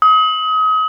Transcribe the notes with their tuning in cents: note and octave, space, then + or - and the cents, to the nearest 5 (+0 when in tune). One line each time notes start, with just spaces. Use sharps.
D#6 +35